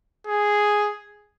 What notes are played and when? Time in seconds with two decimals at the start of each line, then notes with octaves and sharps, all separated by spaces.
0.27 G#4